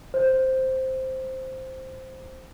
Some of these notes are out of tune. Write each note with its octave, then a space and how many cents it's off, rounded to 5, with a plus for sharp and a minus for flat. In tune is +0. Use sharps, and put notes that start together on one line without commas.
C5 +0